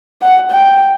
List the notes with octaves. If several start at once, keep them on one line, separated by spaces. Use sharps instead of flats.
F#5
G5